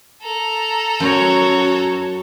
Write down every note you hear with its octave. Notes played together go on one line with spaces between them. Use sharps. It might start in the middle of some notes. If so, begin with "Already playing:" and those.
A4 A#5
F#2 F#4 C#5